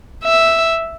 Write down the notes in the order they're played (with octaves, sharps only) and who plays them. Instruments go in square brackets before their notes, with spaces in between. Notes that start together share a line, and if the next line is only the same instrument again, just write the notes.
[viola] E5